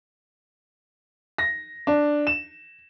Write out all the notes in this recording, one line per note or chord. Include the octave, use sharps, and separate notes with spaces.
A#6
D4
E7